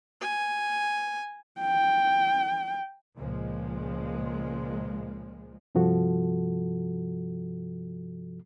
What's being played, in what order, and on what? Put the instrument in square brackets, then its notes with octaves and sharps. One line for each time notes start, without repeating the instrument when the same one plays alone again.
[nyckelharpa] G#5
[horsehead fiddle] G5
[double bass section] C#2 A#2 F3 G#3
[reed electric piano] G2 C3 F3 F#4 A4